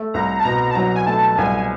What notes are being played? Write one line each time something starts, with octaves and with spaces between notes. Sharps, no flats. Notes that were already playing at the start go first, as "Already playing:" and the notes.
Already playing: A3
C2 A#5
A5
B2 A#5
A5
F#3 A#5
G#5
A3 A5
C2 G#5